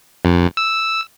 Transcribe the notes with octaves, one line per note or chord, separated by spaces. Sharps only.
F2
E6